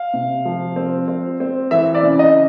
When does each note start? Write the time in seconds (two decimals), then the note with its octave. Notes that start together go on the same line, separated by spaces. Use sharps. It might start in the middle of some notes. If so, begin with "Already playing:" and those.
Already playing: F5
0.13 C3
0.45 F3
0.76 C4
1.08 C4
1.40 C4
1.71 E3 E5
1.95 D5
2.03 C#3
2.19 D#5